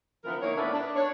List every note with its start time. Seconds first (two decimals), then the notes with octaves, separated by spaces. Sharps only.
0.25 D3 E3 F3 B3 A#4
0.42 A#3 D#4 E4 C#5
0.56 A2 B3 D4 A#4 B4 E5
0.72 D4
0.96 D4 C#5